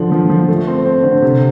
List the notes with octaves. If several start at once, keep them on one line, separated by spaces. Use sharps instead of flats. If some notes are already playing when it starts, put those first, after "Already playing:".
Already playing: D3 F3
F3
F3
A3
C4
C4
D3
C3